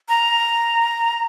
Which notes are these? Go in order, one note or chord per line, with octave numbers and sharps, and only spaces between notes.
A#5